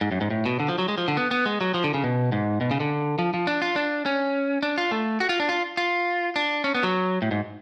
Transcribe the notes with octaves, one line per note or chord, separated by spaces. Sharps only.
G#2
F#2
G#2
A2
B2
D3
F3
F#3
G#3
F3
D3
B3
B3
G#3
F#3
F3
D3
C#3
B2
G#2
B2
C#3
D3
F3
F3
D4
F4
D4
C#4
D4
F4
A3
F#4
F4
D4
F4
F4
D4
C#4
B3
F#3
A2
G#2